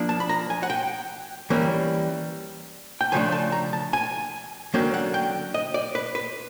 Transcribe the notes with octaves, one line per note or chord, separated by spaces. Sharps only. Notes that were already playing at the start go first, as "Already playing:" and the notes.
Already playing: F3 A#3 D4
A5
B5
A#5
G#5
F#5
G5
E3 G3 A#3 C#4
G5
C#3 F3 A3 D4 G#5
A5
A#5
A5
G#5
D3 F#3 A#3 C#4 G5
F#5
G5
D#5
D5
B4
B4